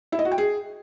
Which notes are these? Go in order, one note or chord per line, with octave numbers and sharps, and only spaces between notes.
E4
D#5
F#4
G5
G#4